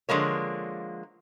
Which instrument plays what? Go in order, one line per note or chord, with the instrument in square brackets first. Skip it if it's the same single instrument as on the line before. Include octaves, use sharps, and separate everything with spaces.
[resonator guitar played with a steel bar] D3 F3 G#3 A#3 C#5